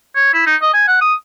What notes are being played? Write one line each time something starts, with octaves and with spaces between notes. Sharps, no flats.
C#5
E4
D#4
D#5
G#5
F#5
D#6